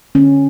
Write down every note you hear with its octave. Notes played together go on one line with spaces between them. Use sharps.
D3 C#4